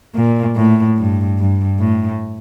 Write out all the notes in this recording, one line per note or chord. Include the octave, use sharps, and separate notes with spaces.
A#2
A2
G2
G2
A2